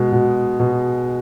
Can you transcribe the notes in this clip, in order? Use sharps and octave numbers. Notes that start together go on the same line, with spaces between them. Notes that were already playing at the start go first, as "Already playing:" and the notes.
Already playing: B2 G#3
B2
B2